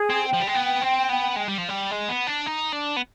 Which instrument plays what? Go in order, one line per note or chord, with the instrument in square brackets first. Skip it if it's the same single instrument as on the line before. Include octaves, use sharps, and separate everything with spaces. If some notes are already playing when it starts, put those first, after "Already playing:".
Already playing: [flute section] G#4
[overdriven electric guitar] C4
[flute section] G5
[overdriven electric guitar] F3
G3
G#3
B3
C4
B3
G#3
G3
F3
G3
G#3
B3
D4
D#4
D4
B3